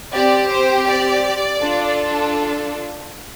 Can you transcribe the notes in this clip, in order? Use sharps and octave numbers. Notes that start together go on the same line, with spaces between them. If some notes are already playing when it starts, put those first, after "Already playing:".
C4 G4 D5
C5
D5
D4 F4 A4